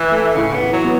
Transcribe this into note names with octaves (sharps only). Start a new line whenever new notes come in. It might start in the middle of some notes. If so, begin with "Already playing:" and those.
Already playing: E3
A3
A2 C#3
B3
E3
F#3
B3